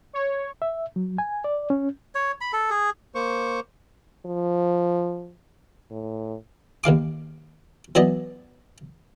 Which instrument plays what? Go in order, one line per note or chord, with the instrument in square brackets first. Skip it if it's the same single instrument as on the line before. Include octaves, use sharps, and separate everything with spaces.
[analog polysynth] C#5
[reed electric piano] E5
F#3
G#5
D5
C#4
[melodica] C#5
B5
A4
G#4
[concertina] A#3 C5 C#6
[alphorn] F3
A2
[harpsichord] D#2 D#3 F5 D6
E3 F#3 B3 D5 D#5